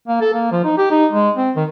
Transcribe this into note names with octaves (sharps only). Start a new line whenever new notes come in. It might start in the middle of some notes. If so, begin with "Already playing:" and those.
A#3
A4
A#3
F3
D#4
G4
D#4
G#3
C4
D#3